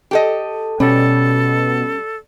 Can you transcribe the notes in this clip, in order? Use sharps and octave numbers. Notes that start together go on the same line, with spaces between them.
G4 A4 D#5
B2 G3 C#4 A4